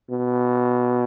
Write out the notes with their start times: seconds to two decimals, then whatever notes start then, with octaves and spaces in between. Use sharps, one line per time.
0.10 B2